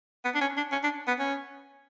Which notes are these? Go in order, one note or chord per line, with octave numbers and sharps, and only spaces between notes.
B3
D4
C#4
D4
C#4
D4
B3
C#4